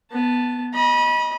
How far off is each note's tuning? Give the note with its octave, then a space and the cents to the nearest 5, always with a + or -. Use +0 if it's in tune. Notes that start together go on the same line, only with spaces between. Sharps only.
B3 +0 A5 -5
D#5 +0 B5 -30